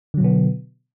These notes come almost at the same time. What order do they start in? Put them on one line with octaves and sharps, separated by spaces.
D3 F#3 B2 B3